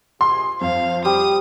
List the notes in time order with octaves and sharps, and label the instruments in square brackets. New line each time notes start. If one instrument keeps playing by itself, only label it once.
[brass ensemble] A#1 C3 G#4 [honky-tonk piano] C6
[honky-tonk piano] F2 [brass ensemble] C5 [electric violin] F5
[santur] G3 [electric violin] D#6